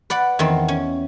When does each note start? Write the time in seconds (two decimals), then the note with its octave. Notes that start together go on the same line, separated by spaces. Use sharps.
0.10 B4 D5 F#5
0.39 E2 D#3 C4
0.68 C#4